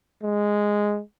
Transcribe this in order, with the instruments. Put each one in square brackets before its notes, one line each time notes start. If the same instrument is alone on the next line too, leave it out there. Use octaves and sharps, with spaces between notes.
[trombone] G#3